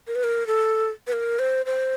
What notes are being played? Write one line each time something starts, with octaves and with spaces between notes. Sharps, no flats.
A#4
B4
A#4
A4
B4
A#4
C5
C5